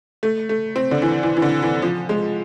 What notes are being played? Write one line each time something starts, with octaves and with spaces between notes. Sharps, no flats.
A3
A3
C4
D3
E3
E3
E3
D3
E3
F3
G#3